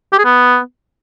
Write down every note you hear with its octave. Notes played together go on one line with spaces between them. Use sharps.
G4
G#4
B3